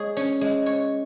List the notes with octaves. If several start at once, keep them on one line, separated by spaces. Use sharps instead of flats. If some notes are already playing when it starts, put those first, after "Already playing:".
Already playing: G#3 G#4 C#5
C#4
G#3
C#5